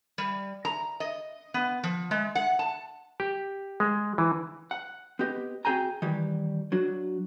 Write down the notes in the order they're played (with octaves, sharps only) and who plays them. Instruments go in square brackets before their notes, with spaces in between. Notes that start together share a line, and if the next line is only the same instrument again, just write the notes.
[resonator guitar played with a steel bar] G3
A#5
D#5
B3
F3
G#3
F#5
A5
[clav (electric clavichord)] G4
G#3
E3
[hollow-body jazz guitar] F#5
B3 C4 G4 D#5
C4 F#4 G#4 G5 G#5 A#5
D#3 E3 G3
F#3 D4 F#4